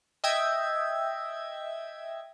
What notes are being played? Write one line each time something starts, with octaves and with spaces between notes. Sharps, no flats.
D#5 E5 G5 G#6